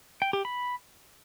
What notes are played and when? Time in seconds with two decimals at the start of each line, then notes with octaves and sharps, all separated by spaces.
0.22 G5
0.33 G4
0.45 B5